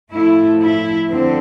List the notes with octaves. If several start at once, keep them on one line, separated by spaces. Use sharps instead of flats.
A2 F3 A3 E4
E4
F2 D3 C4